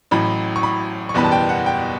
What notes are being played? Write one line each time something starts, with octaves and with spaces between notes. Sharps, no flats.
A1 A2 F#3 B5
C#6
B5
C#6
F#1 E2 B2 G3 B3 B5
A5
G5
F#5
G5